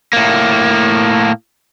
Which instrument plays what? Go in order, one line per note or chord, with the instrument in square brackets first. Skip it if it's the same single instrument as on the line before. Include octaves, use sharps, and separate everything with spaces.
[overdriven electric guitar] A2 A#3